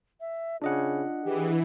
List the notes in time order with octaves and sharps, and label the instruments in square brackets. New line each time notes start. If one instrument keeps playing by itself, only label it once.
[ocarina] E5
[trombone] C#3 [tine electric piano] D4 D#5 F#5 [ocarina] F4
[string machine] E3 [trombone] G4 [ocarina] G#4